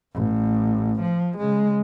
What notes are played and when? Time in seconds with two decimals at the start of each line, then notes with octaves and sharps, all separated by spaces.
0.14 A1
1.02 F3
1.38 C#3 G#3